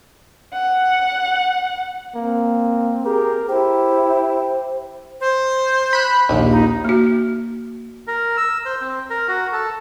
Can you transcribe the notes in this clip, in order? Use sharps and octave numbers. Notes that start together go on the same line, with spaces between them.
F#5
A#3 C4
G4 G#4 A#4
E4 G4 C5
C5
B5 F#6
A#1 D#2
D#4
A#3 F#4
A#4
E6
C5
C4
A#4
F#4
A4